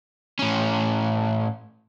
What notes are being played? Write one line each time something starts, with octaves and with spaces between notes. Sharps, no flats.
A2 C#4